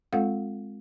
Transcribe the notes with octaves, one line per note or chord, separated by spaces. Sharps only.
G#3 C4 F4 A4 F5 F#5